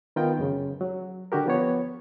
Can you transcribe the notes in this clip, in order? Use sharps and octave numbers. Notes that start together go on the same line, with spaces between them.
D#3 B3 F4 A#4 G5
F#2 C#3
F#3
D3 F#4 G4 A#4
F3 B3 C#5